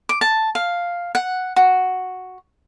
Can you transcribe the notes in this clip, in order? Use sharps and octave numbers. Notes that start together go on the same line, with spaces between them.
D6
A5
F5
F#5
F#4